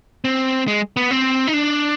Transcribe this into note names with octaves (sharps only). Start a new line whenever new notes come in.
C4
G#3
B3
C4
D#4
D4